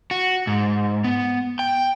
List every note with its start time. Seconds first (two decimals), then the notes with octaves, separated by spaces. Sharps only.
0.11 F#4
0.47 G#2
1.04 B3
1.59 G5